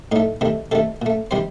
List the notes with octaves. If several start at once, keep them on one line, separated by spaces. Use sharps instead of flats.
A2 A3 D#4
C3 D#3 A3
C3 D#3 A3 A4
A#2 A3
C3 D#3 G3 C5